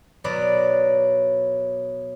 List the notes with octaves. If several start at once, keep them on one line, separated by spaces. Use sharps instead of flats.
B2 F#3 B3 D5